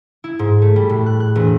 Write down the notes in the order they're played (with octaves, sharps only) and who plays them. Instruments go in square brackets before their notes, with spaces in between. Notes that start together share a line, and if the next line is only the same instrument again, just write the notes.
[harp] E4
G#2
A3
G3
A2
F#6
F#6
E1